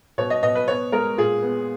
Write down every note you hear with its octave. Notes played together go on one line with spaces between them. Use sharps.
B2 C#5
D#5
B2 D#5
B4
B3 C#5
G#3 A#4
A#2 G#4
B3